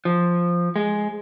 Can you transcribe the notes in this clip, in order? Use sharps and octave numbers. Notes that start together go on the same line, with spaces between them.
F3
G#3